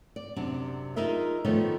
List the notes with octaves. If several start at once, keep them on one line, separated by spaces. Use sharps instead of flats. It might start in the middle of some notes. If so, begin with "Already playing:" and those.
D5
F#2 C3 D4
D#4 F4 G#4 A#4 D#5 E5
D#3 F3 A3 B3 D#4 C#5